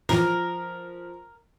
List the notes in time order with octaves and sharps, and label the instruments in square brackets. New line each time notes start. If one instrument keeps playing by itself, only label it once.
[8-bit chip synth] F#2 A2 E3 [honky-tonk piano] F3 [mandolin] A#4